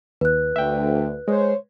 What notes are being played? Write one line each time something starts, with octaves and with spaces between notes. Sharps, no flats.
D#2 B4 F#6
D2 E5 G5
G#3 C5 C#5